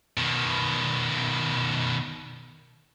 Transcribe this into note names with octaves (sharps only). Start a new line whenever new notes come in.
B2 D#3